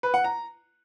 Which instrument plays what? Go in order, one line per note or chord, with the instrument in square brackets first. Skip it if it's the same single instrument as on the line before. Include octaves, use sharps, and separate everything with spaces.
[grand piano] B4
F#5
A#5